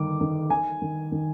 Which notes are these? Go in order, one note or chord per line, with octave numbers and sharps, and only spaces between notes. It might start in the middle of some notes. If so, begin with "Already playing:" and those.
Already playing: G1 D#3 D6
D#3
D#3 G#5
D#3
D#3